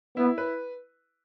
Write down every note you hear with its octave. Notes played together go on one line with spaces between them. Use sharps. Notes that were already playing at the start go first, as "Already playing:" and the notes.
B3 E4
B4